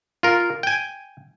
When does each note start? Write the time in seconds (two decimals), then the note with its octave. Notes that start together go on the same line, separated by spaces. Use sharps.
0.23 F4 A#4
0.63 G5 G#5